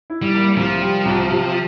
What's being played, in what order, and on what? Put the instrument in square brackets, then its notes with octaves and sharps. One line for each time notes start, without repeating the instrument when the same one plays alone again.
[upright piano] E4
[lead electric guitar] G3
[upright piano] A#3
[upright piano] C2 [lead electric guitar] F3
[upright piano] G3
C2
C3